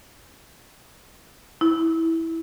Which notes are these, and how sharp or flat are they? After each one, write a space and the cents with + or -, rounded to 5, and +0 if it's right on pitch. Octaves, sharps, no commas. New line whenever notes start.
E4 -10